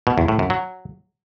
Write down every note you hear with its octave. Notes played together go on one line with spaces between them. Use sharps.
B2
E2
A2
F#2
F#3